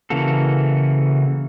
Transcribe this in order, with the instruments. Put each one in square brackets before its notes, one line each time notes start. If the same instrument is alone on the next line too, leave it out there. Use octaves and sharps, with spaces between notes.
[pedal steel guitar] C#3 E3 A#3 F#4 A4